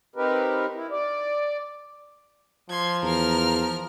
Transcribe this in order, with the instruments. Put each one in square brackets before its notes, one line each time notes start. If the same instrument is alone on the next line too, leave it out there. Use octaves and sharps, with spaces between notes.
[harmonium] C4 D#4 G4 A#4 B4
E4
D5
[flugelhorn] F3 [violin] C6 G#6
[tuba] E2 [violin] A#4 F6